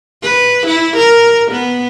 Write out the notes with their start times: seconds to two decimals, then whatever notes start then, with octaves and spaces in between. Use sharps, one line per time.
0.23 B4
0.67 E4
0.97 A#4
1.51 B3